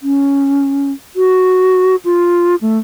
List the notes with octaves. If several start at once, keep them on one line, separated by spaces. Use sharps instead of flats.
C#4
F#4
F4
A3